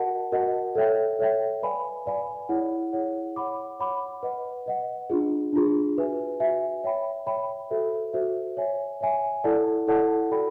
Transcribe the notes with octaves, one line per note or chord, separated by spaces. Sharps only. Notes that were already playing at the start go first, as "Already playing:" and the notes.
Already playing: F#4 A#4 D#5 F#5 A5
F#4 A#4 D#5 F#5 A5
A4 C#5 E5 G5
A4 C#5 E5 G5
B4 D5 F5 G#5 B5
B4 D5 F5 G#5 B5
E4 G#4 C#5 F#5
E4 G#4 C#5 F#5
C#5 F#5 B5 D6
C#5 F#5 B5 D6
B4 D#5 F#5
B4 D#5 F#5
D4 F4 G#4
D4 F4 G#4
F#4 B4 E5 G#5
F#4 B4 E5 G#5
C#5 E5 G5 B5
C#5 E5 G5 B5
F#4 A4 C5 E5
F#4 A4 C5 E5
C#5 E5 G#5
C#5 E5 G#5
E4 A4 D5 F#5 A5
E4 A4 D5 F#5 A5
F#4 A4 D5 G5 B5